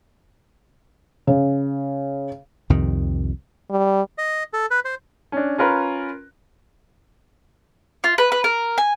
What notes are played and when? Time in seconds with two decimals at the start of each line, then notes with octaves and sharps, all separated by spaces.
1.27 C#3
2.70 C2 F2 C3 D#3
3.71 G3
4.18 D#5
4.53 A4
4.71 B4
4.85 C5
5.32 C#4 D4
5.58 C#4 F4 A#4 B4
8.04 F4
8.18 B4
8.32 B4
8.44 A#4
8.78 G#5